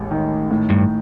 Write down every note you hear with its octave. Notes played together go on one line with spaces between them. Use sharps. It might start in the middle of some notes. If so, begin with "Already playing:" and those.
Already playing: A1 D#2 G#3
D#3
A2
G2